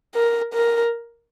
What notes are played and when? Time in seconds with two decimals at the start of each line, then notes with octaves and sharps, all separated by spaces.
0.15 A#4
0.54 A#4